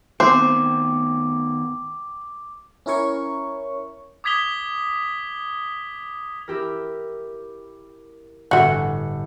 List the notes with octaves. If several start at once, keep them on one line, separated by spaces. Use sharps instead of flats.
D#3 B3 C4 C5 D6
C#4 E4 A#4 C#5 C#6
D6 D#6 G#6 B6 F7 G7
E4 G4 A#4
G1 A2 E3 F#4 C#7